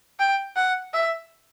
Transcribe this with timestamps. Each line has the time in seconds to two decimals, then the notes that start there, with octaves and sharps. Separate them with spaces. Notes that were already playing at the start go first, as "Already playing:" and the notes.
0.19 G5
0.56 F#5
0.93 E5